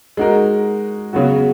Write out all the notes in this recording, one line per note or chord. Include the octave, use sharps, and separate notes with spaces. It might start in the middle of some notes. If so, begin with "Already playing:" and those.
G#3 D#4 F#4 A#4
C#3 F#3 B3 F#4